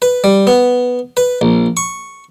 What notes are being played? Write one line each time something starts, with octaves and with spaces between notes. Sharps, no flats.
B4
G3
B3
B4
A#1
C#6